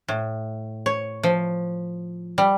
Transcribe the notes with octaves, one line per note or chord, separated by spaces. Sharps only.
A2
C#5
F3
G3